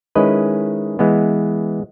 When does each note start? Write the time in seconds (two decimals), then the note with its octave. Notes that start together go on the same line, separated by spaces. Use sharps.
0.15 D#3 G#3 C#4 E4 B4 D#5
0.99 E3 G#3 B3